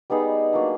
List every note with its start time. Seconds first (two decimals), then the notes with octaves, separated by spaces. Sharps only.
0.10 G3 B3 D#4 G#4
0.53 F#3 A#3 D4